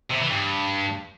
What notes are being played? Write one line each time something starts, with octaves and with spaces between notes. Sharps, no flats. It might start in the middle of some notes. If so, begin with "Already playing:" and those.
C3
E3
G2